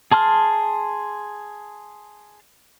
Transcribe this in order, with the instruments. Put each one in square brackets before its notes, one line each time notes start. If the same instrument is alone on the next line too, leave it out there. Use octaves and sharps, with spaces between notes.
[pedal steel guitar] G#4 A5 C6 F6